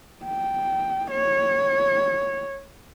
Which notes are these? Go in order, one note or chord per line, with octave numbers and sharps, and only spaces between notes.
G5
C#5